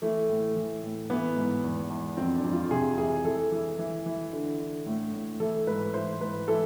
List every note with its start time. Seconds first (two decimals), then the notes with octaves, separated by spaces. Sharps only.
0.02 E3 A3
0.29 A2
0.56 E3
0.83 A2
1.10 E3 B3
1.37 G#2
1.63 E2
1.90 E2
2.17 F2 C4
2.35 D4
2.44 F2
2.53 F4
2.71 C3 G#4
2.98 E3 G#4
3.25 E3 A4
3.52 E3
3.79 E3
4.06 E3
4.33 D3
4.59 D3
4.86 A2
5.13 A2
5.40 E3 A4
5.67 G#2 B4
5.94 E3 C5
6.21 G#2 B4
6.48 E3 A4